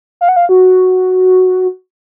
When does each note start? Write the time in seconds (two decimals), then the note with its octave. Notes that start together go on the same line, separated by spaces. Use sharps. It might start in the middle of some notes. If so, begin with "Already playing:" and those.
0.21 F5
0.28 F#5
0.36 F5
0.49 F#4